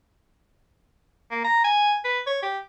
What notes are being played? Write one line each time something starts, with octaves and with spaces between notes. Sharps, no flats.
A#3
A#5
G#5
B4
C#5
G4